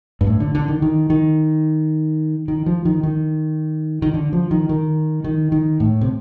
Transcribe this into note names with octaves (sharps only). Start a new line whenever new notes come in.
G2
A2
D3
D3
D#3
D#3
D#3
D#3
F3
D#3
D#3
D#3
D3
F3
D#3
D#3
D#3
D#3
A2
C3